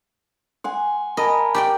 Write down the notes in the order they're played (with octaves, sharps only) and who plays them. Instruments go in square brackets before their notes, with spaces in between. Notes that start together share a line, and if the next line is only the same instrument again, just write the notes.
[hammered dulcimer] F#5 G#5 [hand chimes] C6
[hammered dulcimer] A#4 [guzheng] D#5 [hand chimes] G#5 A5 B5
[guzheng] G4 D5 G5 [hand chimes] D6